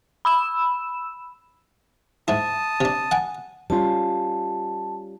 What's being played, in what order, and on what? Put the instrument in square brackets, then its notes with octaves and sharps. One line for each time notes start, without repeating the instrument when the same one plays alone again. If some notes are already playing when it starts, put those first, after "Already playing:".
[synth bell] B5 E6 E7
[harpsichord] G#2 E4 [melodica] A5 D#6
[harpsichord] C3 D4
F#5 G#5
[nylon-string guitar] G3 C#4 F4 [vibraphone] A5